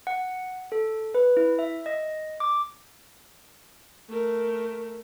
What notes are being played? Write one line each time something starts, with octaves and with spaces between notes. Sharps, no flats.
F#5
A4
B4
E4
E5
D#5
D6
A3 A#4